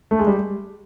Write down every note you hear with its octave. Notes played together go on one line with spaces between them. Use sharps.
A3
G#3
G3